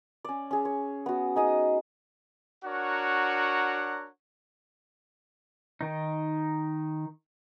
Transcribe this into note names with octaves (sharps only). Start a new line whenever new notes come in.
C#4 D5
C#4 G#4
C#5
B3 F#4
D#4 G#4 D#5 D#6
D4 F#4 A#4 C#5 F#5 A#5
D#3 D#4